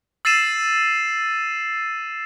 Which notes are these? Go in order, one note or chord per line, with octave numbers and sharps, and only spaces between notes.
E6 A6 C7 D#7 E7